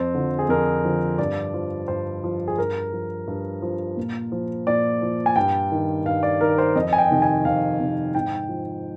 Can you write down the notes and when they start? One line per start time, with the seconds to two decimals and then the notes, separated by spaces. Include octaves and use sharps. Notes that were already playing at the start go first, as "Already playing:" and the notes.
Already playing: F2 C4
0.14 D3 F3
0.39 G#4
0.49 F2 A#4
0.85 D3 F3
1.18 G2 D5
1.54 F3
1.88 G2 C5
2.24 F3
2.48 G#4
2.58 G2 A#4
2.93 F3
3.28 G2
3.62 F3
3.97 A#2
4.32 F3
4.67 A#2 D5
5.02 F3
5.26 G#5
5.36 G2 G5
5.72 D#3
6.06 G2 F5
6.23 D5
6.41 D#3 A#4
6.58 C5
6.75 F2 D#5
6.93 G#5
6.98 G5
7.11 C3 D#3
7.22 G#5
7.45 F2 F5
7.80 C3 D#3
8.15 G#2 G5
8.49 F3